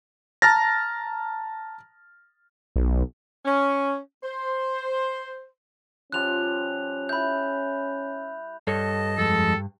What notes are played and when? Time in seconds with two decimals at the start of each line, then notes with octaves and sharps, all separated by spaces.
0.42 A5 A#5 F6 A6 A#6
2.76 B1
3.45 C#4
4.24 C5
6.12 F3 G3 C#4 F4 F#6 F7
7.09 E4 E5 B5 G6
8.67 G2 A4 C#5 D#5 A5
9.18 F2 G#3 A4